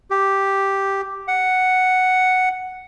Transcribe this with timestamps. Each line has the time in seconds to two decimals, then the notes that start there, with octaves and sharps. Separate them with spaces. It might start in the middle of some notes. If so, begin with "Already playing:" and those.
0.10 G4
1.28 F#5